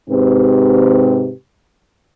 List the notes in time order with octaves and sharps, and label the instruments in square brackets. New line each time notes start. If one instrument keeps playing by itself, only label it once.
[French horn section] G#2 C3 C4 G4 B4